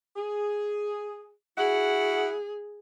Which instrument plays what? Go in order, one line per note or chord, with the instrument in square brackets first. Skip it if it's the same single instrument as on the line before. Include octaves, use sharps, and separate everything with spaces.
[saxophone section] G#4
[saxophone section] E4 F#4 F#5 [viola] G#4